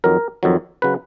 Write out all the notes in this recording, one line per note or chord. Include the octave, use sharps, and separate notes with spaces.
F2 D#3 F#3 A#4
F2 D#3 F#3
C#3 F#3 B4